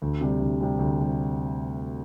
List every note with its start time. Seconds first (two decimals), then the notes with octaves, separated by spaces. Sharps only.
0.02 D2
0.21 C3 G3
0.40 D2
0.60 C3 G3
0.79 D2
0.99 C3 G3